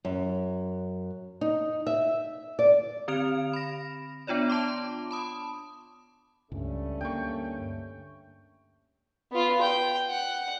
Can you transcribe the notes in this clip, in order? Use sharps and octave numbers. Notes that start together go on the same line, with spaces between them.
F#2
D#4
E5
D5
D3 C4 F6 D7 F7
B5 A#6
B3 D4 F4 C#5 D5
A5 C6 D6
A5 B5 D#6
C#2 G2 G3 A3 C#4
D2 A#3 G5 C#6
B3 F4
G5
F#5